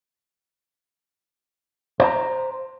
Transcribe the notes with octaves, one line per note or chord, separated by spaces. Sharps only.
C5 A#5